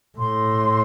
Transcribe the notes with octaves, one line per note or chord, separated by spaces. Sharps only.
A2 C6